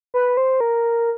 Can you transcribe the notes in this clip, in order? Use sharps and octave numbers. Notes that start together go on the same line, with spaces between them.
B4
C5
A#4